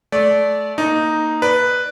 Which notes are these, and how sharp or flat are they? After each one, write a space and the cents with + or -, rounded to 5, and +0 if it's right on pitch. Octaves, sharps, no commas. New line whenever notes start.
A3 -25 D5 -15
A#3 +0 D#4 +0
B4 +0 D5 +0